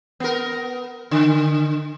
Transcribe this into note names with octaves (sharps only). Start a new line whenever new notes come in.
B3 A#4
D3